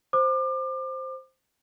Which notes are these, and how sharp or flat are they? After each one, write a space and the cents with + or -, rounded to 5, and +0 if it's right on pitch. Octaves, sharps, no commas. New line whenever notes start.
C5 +0 D6 +30